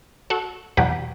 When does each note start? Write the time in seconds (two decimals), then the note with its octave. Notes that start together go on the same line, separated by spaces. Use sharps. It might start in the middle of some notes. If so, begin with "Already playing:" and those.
0.30 F#4 A4
0.77 E2 B2 F#3 G4 B4